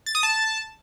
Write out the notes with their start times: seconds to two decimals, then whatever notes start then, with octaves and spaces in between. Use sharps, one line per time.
0.06 A6
0.15 D#6
0.23 A5